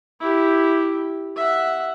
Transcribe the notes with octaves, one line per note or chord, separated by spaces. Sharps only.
E4 G4
E5 F#5